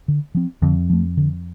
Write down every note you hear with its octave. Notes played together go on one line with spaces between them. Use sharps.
D3
F3 C4
F2 D3
F3 A3
D3